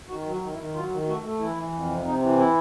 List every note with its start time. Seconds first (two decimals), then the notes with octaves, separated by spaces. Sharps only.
0.08 D#3 F#4
0.26 F#3 F#4
0.41 D#3
0.53 E4
0.57 D#3
0.74 F#3 F4
0.91 D#3
1.07 A3 F#4
1.23 A3
1.39 E3 E4
1.56 E3
1.72 F2
1.88 C3
2.05 C3 D#4
2.21 E3
2.38 E4